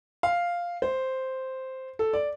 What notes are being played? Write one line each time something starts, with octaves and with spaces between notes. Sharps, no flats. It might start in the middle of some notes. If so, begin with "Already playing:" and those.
F5
C5
A4
D5